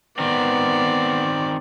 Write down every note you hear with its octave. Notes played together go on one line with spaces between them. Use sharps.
D#3 B3 C4 D5